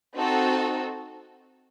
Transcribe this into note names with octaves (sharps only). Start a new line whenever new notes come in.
C4 D#4 F#4 A4